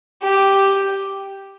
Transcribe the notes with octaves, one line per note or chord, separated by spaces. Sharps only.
G4